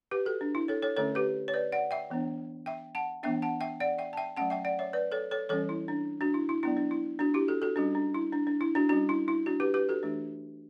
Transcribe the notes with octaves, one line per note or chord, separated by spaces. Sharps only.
G4 B4
F#4 A4
D4
E4
A4 C#5
A4 C#5
D3 A3 C#4 A4 C#5
G4 B4
C#5
B4 D5
D5 F#5
E5 G5
E3 B3 D4
E5 G5
F#5 A5
E3 B3 D4 E5 G5
F#5 A5
E5 G5
D5 F#5
E5 G5
A5
E5 G5
F#3 A3 C#4 F#5 A5
E5 G5
D5 F#5
C#5 E5
B4 D5
A4 C#5
A4 C#5
E3 G3 C#4 A4 C#5
E4
D4
D4 F#4
E4
E4
F#3 B3 D4 E4
D4
E4
D4 F#4
E4 G4
F#4 A4
F#4 A4
G3 C#4 D4 F#4
D4
E4
D4
D4
E4
D4 F#4
G3 C#4 D4 F#4
E4
E4
D4 F#4
G4 B4
G4 B4
F#4 A4
E3 A3 D4